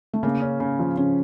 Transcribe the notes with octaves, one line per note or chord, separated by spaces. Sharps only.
A3
C#3 A#3
C#4
C#3
F3
C#3 C#4